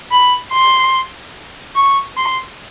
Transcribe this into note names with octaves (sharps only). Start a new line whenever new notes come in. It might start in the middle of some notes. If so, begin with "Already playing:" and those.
B5
C6
C#6
C6